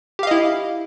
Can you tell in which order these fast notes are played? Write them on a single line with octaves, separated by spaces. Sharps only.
G4 F5 D#5 E4